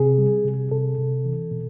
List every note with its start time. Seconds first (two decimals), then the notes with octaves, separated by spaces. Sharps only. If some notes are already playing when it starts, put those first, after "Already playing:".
Already playing: C3 G#4
0.18 G3
0.45 C3
0.71 C3 A4
0.98 C3
1.25 E3
1.51 B2